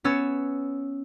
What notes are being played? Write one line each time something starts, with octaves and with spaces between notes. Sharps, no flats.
B3 C#4 C#5 E6 A6